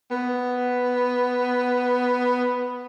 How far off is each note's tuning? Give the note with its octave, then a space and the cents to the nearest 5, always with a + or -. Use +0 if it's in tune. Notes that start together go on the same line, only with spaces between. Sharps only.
B3 +5